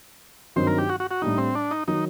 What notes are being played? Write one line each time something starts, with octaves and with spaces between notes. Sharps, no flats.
G2 D#3 F#3 C4 D#4 C5
A#4
G4
F#4
F#4
F#4
A2 G3 D4 D#4
C4
D4
D#4
D#3 F#3 D#4